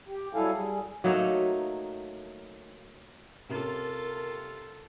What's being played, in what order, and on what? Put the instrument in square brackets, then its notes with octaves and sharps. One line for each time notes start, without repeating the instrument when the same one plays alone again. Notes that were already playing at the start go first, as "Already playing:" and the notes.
[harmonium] G4
F#3 G3 E4 A4 F5 G#5
G3 G#4
[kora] F#3 A3 A#3 D#4
[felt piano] C3 A#3 C#4 [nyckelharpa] F4 A4 [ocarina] A#4